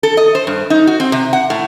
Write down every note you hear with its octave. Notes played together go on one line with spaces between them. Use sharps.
A4
D#5
C5
G2
D#4
F#4
C4
C3
F#5
A2